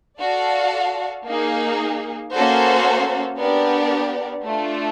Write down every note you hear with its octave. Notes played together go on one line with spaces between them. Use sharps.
F#4 A4 D5 F5
A#3 D#4 G#4
A#3 C#4 F#4 A4 C5
B3 D4 G4 A#4 D5
A3 D4 F4